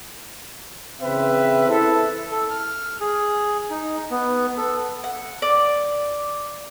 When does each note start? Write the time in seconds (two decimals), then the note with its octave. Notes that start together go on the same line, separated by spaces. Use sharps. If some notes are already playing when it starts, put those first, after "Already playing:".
1.01 C#3 E3 C4 B4 E5
1.68 E4 A4
2.32 A4
2.50 F6
3.01 G#4
3.70 D#4
4.10 B3
4.57 A4
5.04 F#5
5.42 D5